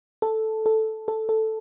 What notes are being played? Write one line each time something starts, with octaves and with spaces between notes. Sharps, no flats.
A4
A4
A4
A4